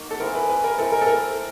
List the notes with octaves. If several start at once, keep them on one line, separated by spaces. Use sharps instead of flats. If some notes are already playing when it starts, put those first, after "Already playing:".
Already playing: F#3 A#3 D#4
A4
C4 E4 G#4 A#4
B4
B4
A#4
G#3 C4 E4 A4
A#4
A4
A#4